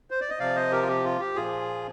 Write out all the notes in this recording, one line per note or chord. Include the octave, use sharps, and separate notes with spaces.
C5
D5
D#5
C3 F3 D5 F5
C5 D#5
G4 A#4
F4
G4
F4
G4
A#2 F3 F4 G#4